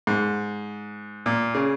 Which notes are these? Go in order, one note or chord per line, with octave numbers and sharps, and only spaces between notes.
G#2
A#2
C#3